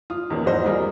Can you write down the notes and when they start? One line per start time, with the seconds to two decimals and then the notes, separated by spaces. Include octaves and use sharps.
0.10 F4 D#6
0.30 E2 A#2 D#3 F3 C#4
0.45 E1 F2 G#2 F#4 C5 D#5
0.65 F3 G3 G#4 A#4 D#5